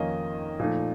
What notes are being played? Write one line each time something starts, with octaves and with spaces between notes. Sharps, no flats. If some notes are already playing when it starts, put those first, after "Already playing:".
Already playing: F2 D#3 A#3 C#4 F4 D#5
A#2 F3 A3 D#4